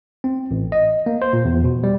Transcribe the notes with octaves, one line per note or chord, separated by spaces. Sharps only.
C4
A1
D#5
A#3
C5
A#2
E2
B2
G3